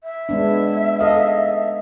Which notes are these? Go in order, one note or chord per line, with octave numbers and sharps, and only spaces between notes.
E5
G#3 B3 D4
A4 D#5 F5